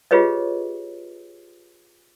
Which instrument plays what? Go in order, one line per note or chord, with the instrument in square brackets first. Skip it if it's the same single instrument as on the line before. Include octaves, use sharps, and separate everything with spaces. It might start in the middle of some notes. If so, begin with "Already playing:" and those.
[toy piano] F4 G4 G#4 B4 C#5 D#5